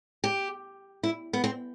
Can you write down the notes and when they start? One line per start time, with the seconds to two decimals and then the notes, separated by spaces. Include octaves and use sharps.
0.24 G4
1.03 E4
1.33 B3
1.44 C4